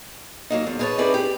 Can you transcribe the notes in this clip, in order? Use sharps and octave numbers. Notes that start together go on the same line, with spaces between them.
F#3 A#3 D#4
E2
E4 G#4 A#4 B4 C#5 A5
C4 D#4 E4 G#4 B4 D5
G4